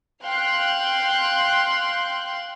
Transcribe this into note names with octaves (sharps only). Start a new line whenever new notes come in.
F5 G5 C6 F#6